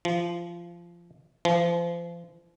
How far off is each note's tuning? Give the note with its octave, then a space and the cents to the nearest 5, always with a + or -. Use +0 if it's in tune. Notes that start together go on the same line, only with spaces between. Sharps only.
F3 -20
F3 -35